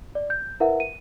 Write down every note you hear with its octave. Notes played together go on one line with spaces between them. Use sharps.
D5
G6
E4 A#4 B4 E5 F#5
D#7